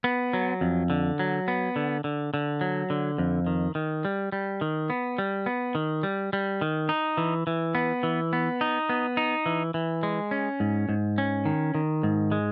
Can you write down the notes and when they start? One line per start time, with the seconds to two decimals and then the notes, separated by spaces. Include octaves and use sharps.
0.04 B3
0.33 F#3
0.61 F2
0.90 D3
1.19 F#3
1.48 B3
1.76 D3
2.04 D3
2.34 D3
2.61 F#3
2.90 D3
3.18 F2
3.47 D#3
3.75 D#3
4.05 G3
4.32 G3
4.61 D#3
4.90 B3
5.18 G3
5.46 B3
5.75 D#3
6.03 G3
6.33 G3
6.61 D#3
6.89 D#4
7.17 E3
7.47 E3
7.75 B3
8.03 E3
8.33 B3
8.61 D#4
8.89 B3
9.17 D#4
9.46 E3
9.74 E3
10.03 G#3
10.31 C#4
10.60 G#2
10.89 G#2
11.18 C#4
11.45 D#3
11.75 D#3
12.03 G#2
12.32 G#3